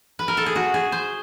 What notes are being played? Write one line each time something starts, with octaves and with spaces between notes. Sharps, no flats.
B4
A#4
A4
G#4
F#4
G#4
C5